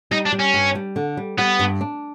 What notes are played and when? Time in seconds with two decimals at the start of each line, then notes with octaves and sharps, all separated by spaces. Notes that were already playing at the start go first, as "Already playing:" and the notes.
0.11 G3 D#4
0.25 D4
0.33 G3
0.39 C#4
0.54 G2
0.75 G3
0.96 D3
1.17 G3
1.38 G3 B3
1.59 G2
1.81 D4